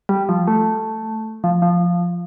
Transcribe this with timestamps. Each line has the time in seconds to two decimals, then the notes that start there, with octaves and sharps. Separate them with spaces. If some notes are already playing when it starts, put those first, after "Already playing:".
0.09 G3
0.29 F3
0.47 A3
1.44 F3
1.62 F3